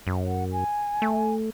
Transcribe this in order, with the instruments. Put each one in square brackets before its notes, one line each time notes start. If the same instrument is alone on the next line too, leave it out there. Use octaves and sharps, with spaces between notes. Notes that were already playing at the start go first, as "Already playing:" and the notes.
[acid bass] F#2
[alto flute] F#5
G#5
[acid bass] A3